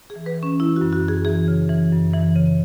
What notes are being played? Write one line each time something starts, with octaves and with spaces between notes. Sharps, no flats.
G#4
E3
B4
E3 C#4
E3 E4
F#4
F#2
F#4
F#2
G#4
E3 G#4
C#3
E3
F#2
E3
C#3